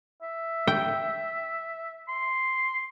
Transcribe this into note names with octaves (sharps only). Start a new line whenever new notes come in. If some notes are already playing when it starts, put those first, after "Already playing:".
E5
G5
C6